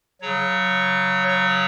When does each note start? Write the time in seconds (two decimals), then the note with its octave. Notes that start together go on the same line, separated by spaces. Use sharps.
0.21 C#3 F#3 C#5
1.28 C#5